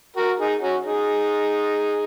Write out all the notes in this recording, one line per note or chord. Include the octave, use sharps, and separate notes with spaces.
F#4 A#4
D#4 G#4
C#4 F#4
D#4 G#4